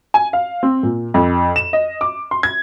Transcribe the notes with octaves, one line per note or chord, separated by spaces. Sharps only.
G#5
F5
C4
A#2
F2
E7
D#5
D6
C6
G#6